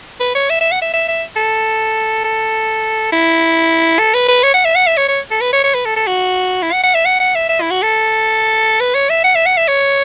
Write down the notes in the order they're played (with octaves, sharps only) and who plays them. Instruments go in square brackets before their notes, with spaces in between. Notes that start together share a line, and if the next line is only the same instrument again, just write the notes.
[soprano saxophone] B4
C#5
E5
E5
F#5
E5
E5
E5
A4
A4
E4
A4
B4
B4
C#5
F#5
E5
F#5
E5
C#5
C#5
A4
B4
C#5
C#5
B4
A4
A4
F#4
E4
F#5
F#5
E5
F#5
F#5
E5
E5
E4
F#4
A4
B4
C#5
E5
F#5
E5
F#5
E5
C#5